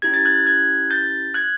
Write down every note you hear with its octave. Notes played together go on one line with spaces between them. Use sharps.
C#4 E4 G4 G#6
A6
F#6 G#6
F#6 G#6
G6 A6
F#6 G#6